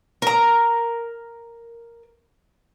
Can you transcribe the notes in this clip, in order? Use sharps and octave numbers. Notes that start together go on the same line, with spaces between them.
A#4 A#5